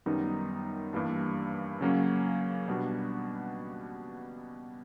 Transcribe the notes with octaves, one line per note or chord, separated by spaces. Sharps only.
F#2 D#3 G3 B3 D#4
G2 E3 G3 A#3 D4
C#3 F#3 A#3 C#4
B2 G3 B3 D4 F#4